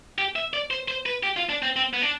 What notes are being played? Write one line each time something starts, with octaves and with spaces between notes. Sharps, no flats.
G4
E5
D5
C5
C5
B4
G4
F4
D4
C4
C4
B3
D4